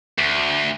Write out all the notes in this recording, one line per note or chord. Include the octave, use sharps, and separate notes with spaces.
D2